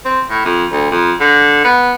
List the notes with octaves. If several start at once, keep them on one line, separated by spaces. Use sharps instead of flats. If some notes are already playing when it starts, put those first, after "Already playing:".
C4
A2
F2
D2
F2
D3
B3